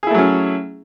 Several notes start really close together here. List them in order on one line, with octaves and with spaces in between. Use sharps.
G#4 E4 A3 F#3 C#4